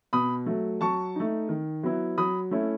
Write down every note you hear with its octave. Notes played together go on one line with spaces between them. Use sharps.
B2 B5 D#6
F#3 A3
F#3 A5 C#6
A3 D#4
D#3
F#3 B3 E4
F#3 B5 D#6
A3 C#4 E4